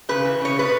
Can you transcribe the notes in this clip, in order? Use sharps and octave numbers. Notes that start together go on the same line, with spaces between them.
C#3 B4
E3
C#3 C#5
A3 B4